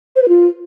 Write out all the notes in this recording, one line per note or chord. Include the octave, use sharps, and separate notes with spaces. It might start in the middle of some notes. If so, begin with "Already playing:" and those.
C5
B4
F4